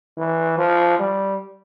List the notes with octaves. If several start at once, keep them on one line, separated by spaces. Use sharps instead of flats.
E3
F3
G3